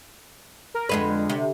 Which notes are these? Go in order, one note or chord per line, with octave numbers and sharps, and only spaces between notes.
A#4
F2 D3 G#3 B4
C3